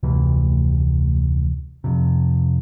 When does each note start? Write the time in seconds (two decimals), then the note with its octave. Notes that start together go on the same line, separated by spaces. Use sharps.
0.03 F1 D2 C3 E3
1.84 F2 C3